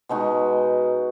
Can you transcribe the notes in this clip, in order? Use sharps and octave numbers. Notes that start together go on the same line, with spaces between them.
B2 G#3 D#4 F#4